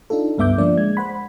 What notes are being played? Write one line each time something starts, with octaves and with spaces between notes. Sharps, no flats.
D4 D#4 F4 A4
C#2 G2 B3 E5 D6 G6
D3 F3 A#3 D4 D5
G#3 G#6
C5 F#5 B5